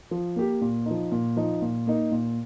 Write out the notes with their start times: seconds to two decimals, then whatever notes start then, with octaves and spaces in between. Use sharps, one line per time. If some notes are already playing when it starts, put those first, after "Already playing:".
0.11 F3
0.36 A#3 G4
0.61 A#2
0.86 F3 D#4
1.12 A#2
1.37 F3 D#4
1.62 A#2
1.87 A#3 D#4
2.12 A#2